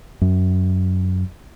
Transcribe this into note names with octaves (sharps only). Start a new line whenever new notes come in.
F#2